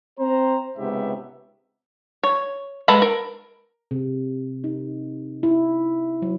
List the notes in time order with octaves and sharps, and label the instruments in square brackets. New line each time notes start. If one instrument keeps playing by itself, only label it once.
[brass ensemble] C4 C5 A#5
C#2 G#2 C3 B3 G4 E5
[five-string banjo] C#5
G#3 A4 B4 A#5 B5
A#4
[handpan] C3
D#4
E4
F#3